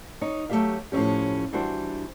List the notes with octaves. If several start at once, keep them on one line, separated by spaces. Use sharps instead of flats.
D#4 C#5
F#3 A3 C4 G4 E5 F5
A2 F3 A3 C#4 G4
E3 G3 D4 F#4 C5